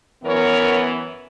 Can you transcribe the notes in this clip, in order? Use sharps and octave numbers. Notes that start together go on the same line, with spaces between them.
F#2 E3 B3 A#4 C#5